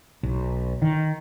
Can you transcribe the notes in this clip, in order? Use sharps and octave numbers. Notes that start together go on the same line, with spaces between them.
B1
D#3